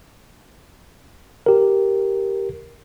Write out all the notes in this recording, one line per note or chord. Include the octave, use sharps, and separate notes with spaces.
G4 A#4